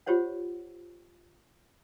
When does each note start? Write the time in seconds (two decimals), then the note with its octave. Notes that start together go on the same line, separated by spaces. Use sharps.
0.06 F4 G4 C5 C#5 F#5